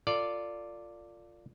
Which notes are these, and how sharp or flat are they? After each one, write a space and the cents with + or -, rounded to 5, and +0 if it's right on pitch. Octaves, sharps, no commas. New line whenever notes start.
F4 +0 A4 +45 D5 +0